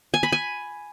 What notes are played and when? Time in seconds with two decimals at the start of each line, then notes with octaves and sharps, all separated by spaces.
0.14 G#5
0.23 B5
0.32 G#5